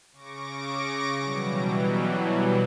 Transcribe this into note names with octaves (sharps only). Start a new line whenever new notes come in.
C#3 C#6 D6 A#6 D7
B2 E3 F#3 G3